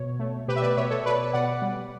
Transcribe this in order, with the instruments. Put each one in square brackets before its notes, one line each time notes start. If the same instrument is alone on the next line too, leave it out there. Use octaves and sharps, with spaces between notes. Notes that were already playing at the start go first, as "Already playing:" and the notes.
Already playing: [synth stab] B2 C#5
A3
B2 G4 B4
E5
B4 D5
B2 C#5 E5
A4 C#5
B2 B4 D5
B2 D5 F#5
G3